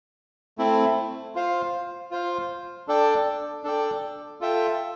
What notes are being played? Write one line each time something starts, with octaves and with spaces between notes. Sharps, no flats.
A3 C4 E4
F4 C5 F5
F4 C5 F5
D4 A4 D5 G5
D4 A4 D5 G5
F4 A4 E5 G5